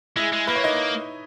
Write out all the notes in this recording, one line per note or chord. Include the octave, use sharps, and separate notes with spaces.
G#3 E4 E5
G#3
A#3 B4
C#5
D#4 D#5